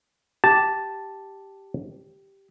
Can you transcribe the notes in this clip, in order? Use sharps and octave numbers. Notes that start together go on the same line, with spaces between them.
G4 A5